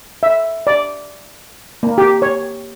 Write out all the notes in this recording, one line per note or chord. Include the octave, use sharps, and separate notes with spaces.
E5
D5
A#3
G4
C#5